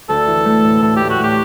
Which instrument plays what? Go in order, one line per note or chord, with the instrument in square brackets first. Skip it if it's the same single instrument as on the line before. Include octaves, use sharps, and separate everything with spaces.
[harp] D2 [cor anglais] A4
[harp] E3
A3
A2
[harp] A2 [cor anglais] A4
[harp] A2 [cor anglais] G4
[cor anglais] F#4
[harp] A2 [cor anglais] G4